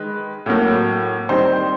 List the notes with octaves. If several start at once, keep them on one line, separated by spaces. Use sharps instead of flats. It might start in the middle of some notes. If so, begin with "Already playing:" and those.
Already playing: D#3 G#3 B4
A2 F#3 A#3
D#3 G3 C4 D#4 C5